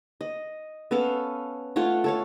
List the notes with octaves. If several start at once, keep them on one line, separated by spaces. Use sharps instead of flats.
D#5
B3 C#4 A4 F5
A3 F4 C#5 F#5
A4 C#5 F5